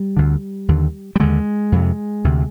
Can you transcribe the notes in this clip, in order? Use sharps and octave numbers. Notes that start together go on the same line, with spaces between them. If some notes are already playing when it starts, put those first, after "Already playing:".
Already playing: G3
D2 D3
D#2 D3
G3
D#2 D3 G#3
F2 C3
D2 C3